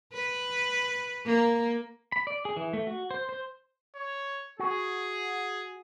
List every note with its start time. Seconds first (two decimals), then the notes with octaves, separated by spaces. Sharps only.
0.13 B4
1.26 A#3
2.12 B5
2.27 D5
2.45 G#4
2.57 E3
2.73 A3
2.87 F#4
3.11 C5
3.29 C5
3.95 C#5
4.60 F#4 G#4